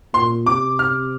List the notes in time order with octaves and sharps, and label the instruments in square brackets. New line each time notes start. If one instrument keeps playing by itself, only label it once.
[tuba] A#2 [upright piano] C6
[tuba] C3 [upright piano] D6
[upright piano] F6